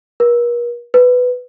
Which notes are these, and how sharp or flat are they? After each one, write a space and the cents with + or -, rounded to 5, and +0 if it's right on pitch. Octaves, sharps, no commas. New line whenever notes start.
A#4 +45
B4 +10